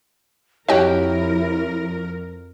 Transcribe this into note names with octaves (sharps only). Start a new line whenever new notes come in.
F2 E4 F#4 G4 A#4 C#5 D#5 G5